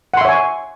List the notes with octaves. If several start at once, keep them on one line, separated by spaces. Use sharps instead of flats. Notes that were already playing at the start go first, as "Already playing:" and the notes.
C#5 E5 F#5 G#5 C6